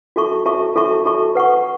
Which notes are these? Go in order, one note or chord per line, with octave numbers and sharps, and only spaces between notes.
F#4 A4 E5 A5 C#6
F#4 A4 E5 A5 C#6
F#4 A4 E5 A5 C#6
F#4 A4 E5 A5 C#6
B4 F#5 C#6